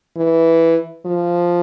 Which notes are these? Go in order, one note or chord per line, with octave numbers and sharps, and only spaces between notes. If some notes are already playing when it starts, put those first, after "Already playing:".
E3
F3